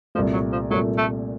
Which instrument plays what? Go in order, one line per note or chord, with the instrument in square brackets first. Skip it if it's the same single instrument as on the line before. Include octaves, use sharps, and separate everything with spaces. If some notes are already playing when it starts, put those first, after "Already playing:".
[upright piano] C2 A#2 A3 [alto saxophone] F3
[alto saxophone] F#3
F3
[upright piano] C2 A#2 A3 [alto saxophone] F#3
[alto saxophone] A3